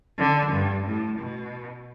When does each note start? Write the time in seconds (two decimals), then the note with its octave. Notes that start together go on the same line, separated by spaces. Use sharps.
0.18 D3
0.51 G2
0.85 A2
1.18 B2